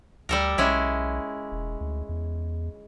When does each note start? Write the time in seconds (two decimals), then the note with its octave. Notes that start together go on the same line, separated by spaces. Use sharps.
0.29 D2 G3 A4 A#4
0.58 B1 G#3 C#4 E4
1.52 E1
1.81 D2
2.09 E2